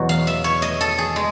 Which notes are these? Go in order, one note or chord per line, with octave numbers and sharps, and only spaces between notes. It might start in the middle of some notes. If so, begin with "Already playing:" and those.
Already playing: E2 B2 F#3
F5
E5
C#5
D#5
A4
G#4
G#3